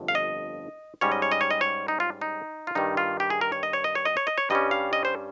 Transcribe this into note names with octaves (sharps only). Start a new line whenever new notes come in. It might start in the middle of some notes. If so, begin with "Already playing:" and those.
Already playing: G1 F2
F5
D#5
G#2 G3 C#4 C#5
D#5
C#5
D#5
C#5
D#5
C#5
D#4
F4
D#4
F4
G2 D#3 G3 D#4
F4
G4
G#4
A#4
C#5
D#5
C#5
D#5
C#5
D#5
C#5
D#5
C#5
G2 G3 C#4 D#5
F5
D#5
C5